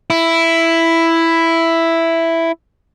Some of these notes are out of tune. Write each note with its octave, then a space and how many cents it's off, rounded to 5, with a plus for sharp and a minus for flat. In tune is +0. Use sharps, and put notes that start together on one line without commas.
E4 +5